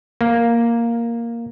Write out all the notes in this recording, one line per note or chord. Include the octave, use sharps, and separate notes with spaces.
A#3